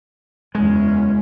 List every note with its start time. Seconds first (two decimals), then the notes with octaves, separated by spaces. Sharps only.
0.55 F#1 E2 G#3 C#4